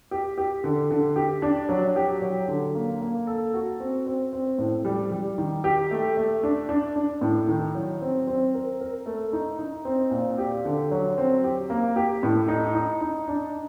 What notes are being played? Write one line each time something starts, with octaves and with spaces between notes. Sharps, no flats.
G4
G4
D3
D3
G4
D4
F#3
G4
F#3
D3
A#3
A#3
A4
F#4
C4
C4
C4
A2
G3
G3
D#3
G4
A3
A3
D4
D4
D4
A2
D#3
F#3
C4
C4
A#4
A#4
A3
D#4
D#4
C4
A#2
G4
D3
F#3
C4
G4
A#3
G4
A2
D#4
D#4
D#4
D4